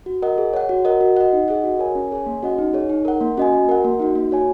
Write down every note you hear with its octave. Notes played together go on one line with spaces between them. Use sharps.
F#4
A#4 D#5 F#5
G#4
C#5 F#5
F#4
A#4 D#5 F#5
F#4
D#5 F#5
D#4
G#4 D#5 F#5
F#4
A#4 C#5 G#5
C#4
G#4 C#5 G#5
A#3
C#4 F#4 D#5 F#5
D#4
G#4 C#5
D#4
A#4 F#5
A#3
C#4 F#4 D#5 G#5
F#4
A#4 F#5
A#3
D#4 F#4
A#3
F#4 C#5 G#5